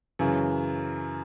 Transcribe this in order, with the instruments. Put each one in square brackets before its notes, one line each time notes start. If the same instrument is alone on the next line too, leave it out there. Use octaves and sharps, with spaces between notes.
[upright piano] F#2 C#3 E3